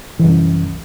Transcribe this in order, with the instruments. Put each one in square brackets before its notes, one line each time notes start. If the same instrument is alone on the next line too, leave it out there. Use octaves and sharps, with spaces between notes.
[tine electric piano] C2 F#2 [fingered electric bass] E3